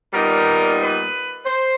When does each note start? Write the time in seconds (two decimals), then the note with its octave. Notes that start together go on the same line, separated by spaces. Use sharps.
0.13 A#2 G3 B3 D#4 A#4
0.79 B4
1.45 C5